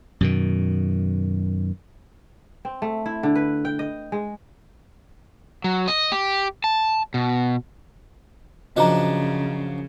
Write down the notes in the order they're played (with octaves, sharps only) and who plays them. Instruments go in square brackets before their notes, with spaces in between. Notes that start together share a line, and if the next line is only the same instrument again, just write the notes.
[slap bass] F#2 B2 D#3
[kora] C4
A3
E4
D3
B4
G5
D#5
G#3
[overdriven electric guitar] F#3
D#5
G4
A5
B2
[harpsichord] F#2 F3 D4 [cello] C#3 [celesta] D#5 A#5